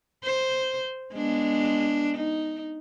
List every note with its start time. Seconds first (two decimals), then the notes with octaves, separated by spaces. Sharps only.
0.24 C5
1.14 G#3 B3 D4
2.17 D#4